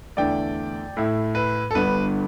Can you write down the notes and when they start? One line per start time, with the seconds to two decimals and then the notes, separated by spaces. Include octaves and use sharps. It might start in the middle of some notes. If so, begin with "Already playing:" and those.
0.17 E2 D3 A3 E4 D5 G5
0.97 A2 A3 E4
1.35 B4
1.71 A4
1.75 G1 G2 D3 B3 B4